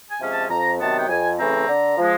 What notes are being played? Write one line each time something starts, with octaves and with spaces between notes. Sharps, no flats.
G#5
C3 F3 G#3 C#4
A5
F2 A#5
C3 D#3 F#3 B3 A5
G5
F2 G#5
C#3 E3 A3 C4 A#5
D3
F3 G#3